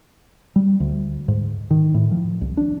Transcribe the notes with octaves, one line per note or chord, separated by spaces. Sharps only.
G3
D2
G#2
D#3
A2
F3
C2
D4